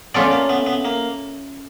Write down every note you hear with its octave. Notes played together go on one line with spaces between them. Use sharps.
A3 B3 C#4 F4 A4 D5
A#3
B3
B3
A#3